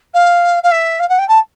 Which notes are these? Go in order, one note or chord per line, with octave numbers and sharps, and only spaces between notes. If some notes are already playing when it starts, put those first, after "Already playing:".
F5
F5
E5
F5
F#5
G5
A5